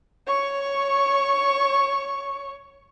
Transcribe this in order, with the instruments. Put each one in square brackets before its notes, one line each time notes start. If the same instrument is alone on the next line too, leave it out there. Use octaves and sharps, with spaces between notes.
[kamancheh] C#5 C#6